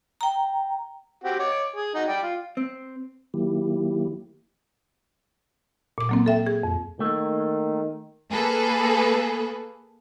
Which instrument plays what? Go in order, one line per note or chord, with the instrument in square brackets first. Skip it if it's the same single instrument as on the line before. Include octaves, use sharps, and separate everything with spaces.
[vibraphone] G5 A#5
[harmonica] C4 F#4 G4
C#5 D6
G#4
D#4 F#4
D5 G5
F4
[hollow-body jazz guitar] C4
[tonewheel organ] D#3 F#3 A#3 E4 G4
[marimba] A#2 D6
F#3 A#3 C4
A4 E5 G5
G#4
F2
[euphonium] D#3 [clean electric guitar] A3 A#3
[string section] A#3 G#4 A4 B4